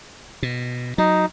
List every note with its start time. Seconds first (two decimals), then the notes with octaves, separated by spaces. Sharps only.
0.43 B2
0.98 F#3 D#4